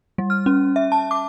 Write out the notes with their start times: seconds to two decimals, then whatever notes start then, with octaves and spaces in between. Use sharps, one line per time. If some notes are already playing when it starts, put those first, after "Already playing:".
0.18 G3
0.30 F6
0.46 C#4
0.76 E5
0.92 A5
1.11 D6